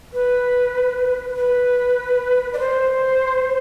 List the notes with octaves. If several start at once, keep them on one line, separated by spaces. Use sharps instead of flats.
B4
B4
D5
C5